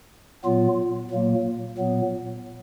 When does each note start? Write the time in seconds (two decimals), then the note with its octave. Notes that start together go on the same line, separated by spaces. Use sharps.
0.44 A#2 F#3 B3 F4
1.11 A#2 F#3 A#3
1.78 A#2 F#3 B3